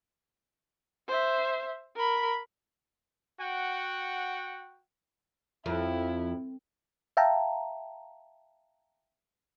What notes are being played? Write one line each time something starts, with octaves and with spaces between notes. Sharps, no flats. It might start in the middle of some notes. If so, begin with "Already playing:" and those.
C5 E5
A#4 B5
F#4 F#5 G5
F2 E4
E5 F5 G5 A5 A#5